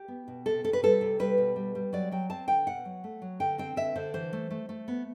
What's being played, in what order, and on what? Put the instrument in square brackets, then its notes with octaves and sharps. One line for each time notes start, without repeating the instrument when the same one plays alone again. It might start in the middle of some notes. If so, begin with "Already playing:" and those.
Already playing: [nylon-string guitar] G4
B3
B2
C3 A4
C3 A4
B4
G3 A4
C3
G3 B4
B2
G3
G3
F#3 D5
F#3 G5
C4 A5
D3 G5
B2 F#5
F#3
A3
F#3
D3 G5
C4 G5
D3 E5
D3 C5
E3 C5
A3
A3
A3
B3